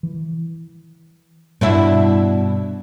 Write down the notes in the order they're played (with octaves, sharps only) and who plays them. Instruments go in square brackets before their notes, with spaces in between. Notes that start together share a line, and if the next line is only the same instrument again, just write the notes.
[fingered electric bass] E3
[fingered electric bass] G2 [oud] B2 D4 E4